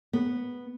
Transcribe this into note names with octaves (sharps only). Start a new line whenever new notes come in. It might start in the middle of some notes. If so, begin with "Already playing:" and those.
B3